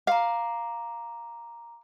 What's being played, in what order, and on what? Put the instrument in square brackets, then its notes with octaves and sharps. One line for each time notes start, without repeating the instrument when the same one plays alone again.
[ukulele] F5 [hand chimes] A#5 C6 D6